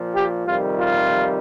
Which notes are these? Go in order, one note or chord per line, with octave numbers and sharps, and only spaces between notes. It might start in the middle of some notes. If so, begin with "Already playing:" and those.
Already playing: A#2 F3
G4
F2 C3 D#3 G3 F4
F4